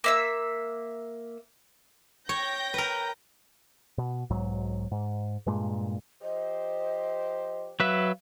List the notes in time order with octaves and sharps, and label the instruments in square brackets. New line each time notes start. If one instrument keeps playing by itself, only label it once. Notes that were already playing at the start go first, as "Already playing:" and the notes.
[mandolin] A#3 E5 E6
[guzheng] C#5 [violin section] G5 G6 A#6
[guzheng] A#4 B4
[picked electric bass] B2
B1 G#2 F#3
G#2
G2 A#2 G#3
[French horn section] F3 G4 C5 [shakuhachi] D#5
[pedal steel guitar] F#3 B4 E5 [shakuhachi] F5